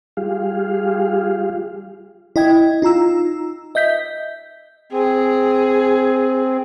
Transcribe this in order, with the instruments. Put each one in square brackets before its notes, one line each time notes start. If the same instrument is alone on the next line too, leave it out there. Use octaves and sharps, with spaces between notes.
[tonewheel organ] G3 F4 G4 G#4 F5
[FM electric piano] E4 D#5 G5 G#6
D#4 F4 A#5 E6
D#5 E5 G6 B6
[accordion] C4 [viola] G#4